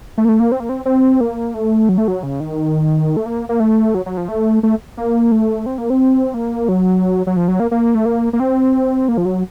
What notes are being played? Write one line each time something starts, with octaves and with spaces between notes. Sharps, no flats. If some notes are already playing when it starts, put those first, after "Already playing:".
A3
A#3
A3
A#3
C4
A#3
C4
C4
A#3
A3
F#3
A3
F#3
C#3
D#3
A3
A#3
A#3
A3
F#3
F#3
F3
A3
A3
A#3
A3
C4
A#3
C4
A#3
F#3
F#3
F3
F#3
A#3
A#3
A3
A#3
A#3
C4
A#3
F3
F#3